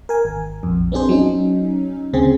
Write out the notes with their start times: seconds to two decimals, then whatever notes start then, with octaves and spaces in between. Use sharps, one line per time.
0.09 A#4 G#5
0.25 G#1
0.63 A#1 F2
0.92 B3 C4 D4 G#4 C5
1.09 F#3 C#4 D#4
2.13 D2 C#3 C4 G#4